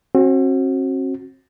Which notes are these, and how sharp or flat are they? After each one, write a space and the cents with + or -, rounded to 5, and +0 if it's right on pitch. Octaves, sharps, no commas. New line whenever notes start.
C4 +45 F#4 +0